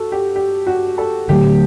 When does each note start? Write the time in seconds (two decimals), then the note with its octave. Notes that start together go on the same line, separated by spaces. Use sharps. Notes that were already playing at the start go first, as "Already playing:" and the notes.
Already playing: F#4 A4
0.12 G4
0.36 G4
0.67 F#4
0.98 A4
1.29 D3 F#3 A3 G4